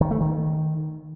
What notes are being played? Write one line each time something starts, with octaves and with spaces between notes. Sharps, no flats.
D#3
A3
D#3